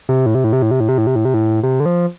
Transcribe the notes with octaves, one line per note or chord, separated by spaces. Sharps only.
C3
A2
C3
A2
C3
A2
C3
A2
C3
A2
C3
A2
C3
A2
C3
D3
F3